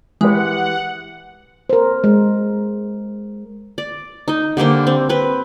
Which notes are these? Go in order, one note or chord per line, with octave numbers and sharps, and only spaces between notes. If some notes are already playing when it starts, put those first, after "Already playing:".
E3 G#3 G4 B4 F#5
A#4 C5
G#3
D5
D#4 D#5
D3 G3 A#3 C5
C4
C4 B4